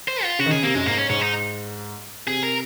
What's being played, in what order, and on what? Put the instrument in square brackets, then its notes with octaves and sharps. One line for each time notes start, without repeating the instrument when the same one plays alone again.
[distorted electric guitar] C5
F4
[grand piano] C#3 [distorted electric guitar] F#4
[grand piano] D#3
[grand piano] C#3 [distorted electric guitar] G#4
[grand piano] C3 [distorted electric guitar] A#3
[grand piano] F#2 [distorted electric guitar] G#3
[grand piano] G#2 [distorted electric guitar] A#3
[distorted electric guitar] C#4
[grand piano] G#2 [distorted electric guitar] C#4
[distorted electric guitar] D#4
[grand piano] C3 [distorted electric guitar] G#4
[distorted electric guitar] A#4